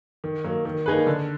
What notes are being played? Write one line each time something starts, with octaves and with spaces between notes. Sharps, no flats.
D#3
F#3 A#3
D#3
A#3 D#4 G#4 B4
D3